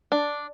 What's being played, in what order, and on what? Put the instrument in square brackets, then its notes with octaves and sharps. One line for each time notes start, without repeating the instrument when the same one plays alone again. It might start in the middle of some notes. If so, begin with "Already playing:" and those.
[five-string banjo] D4